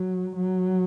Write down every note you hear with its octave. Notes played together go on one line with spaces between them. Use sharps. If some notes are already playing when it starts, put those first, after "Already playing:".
Already playing: F#3
F#3